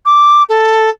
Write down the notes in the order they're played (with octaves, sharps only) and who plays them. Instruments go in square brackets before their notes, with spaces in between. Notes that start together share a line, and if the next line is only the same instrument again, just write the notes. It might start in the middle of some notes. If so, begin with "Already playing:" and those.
[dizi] D6
A4